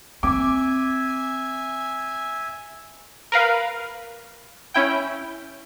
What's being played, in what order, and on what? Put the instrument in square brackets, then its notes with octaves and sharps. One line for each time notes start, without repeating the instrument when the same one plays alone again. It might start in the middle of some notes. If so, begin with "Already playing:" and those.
[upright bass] C4 [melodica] E5 G#5 [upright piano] D6
[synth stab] A#4 B4 F5
C#4 E4 G5